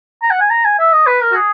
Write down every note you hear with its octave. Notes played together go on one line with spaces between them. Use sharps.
A#5
F#5
G#5
A#5
G#5
E5
D#5
B4
A#4
F#4
G#4